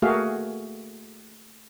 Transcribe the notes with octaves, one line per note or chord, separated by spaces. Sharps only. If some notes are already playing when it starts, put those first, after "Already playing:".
A3 A#3 F#4 G#4 E5 F5